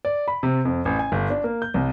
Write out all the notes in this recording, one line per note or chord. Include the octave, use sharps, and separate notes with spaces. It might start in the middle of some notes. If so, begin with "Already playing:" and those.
D5
B5
C3
F2
A1
G#5
G1
D4
A#3
G6
C2